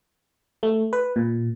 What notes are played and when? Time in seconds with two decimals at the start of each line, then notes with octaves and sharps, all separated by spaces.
0.63 A3
0.93 B4
1.16 A#2